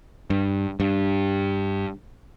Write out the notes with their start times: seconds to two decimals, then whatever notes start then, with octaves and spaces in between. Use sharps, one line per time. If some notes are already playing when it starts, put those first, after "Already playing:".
0.30 G2
0.80 G2